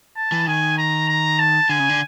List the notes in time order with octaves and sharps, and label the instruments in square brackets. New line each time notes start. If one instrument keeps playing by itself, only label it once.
[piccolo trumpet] A5
[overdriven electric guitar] E3
[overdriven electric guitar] D#3 [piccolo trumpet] G#5
[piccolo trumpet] A#5
A#5
A5
[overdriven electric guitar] D3 [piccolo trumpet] G#5
[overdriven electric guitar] C#3
D3